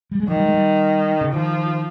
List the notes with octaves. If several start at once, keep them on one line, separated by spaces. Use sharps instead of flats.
G3
G#3
D#3 F3
G3
G#3
G3
C#3
D#3 F3